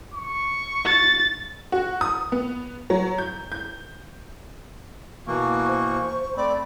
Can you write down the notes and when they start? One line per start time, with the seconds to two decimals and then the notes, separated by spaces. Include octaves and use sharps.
0.14 C#6
0.85 A6
1.72 F#4
2.01 D#6
2.32 B3
2.90 F#3
3.18 G6
3.52 G6
5.27 B2 E3 A#3 C#6
5.65 C5
6.37 A3 C4 D5 B5